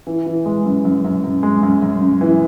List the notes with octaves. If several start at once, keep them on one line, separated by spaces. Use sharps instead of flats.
E3
E3
G#3
F#2
F#2
F#2
F#2
G#3
F#2
F#2
F#2
E3